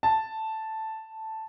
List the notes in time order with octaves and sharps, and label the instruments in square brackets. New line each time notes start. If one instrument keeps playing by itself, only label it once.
[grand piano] A5